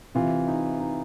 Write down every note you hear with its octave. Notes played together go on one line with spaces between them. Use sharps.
C3 E3 F4
D#4
D#4